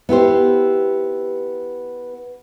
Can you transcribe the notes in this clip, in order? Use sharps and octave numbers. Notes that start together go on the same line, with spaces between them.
B3 E4 G4 C5